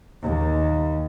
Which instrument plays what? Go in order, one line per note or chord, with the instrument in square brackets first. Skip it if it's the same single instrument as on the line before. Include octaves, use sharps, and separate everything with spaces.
[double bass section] D#2